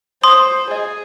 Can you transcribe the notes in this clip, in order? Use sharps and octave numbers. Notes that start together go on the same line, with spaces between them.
C5 C6 D#6
G#4 D#5